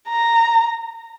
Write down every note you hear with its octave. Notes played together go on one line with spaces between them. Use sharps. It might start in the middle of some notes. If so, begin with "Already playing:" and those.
A#5